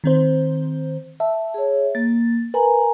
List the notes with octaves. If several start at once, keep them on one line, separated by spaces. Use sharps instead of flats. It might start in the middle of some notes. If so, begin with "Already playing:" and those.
D#3 C4 C5
E5 A5
G#4 C#5
A#3 A6
A#4 B4 G#5 A#5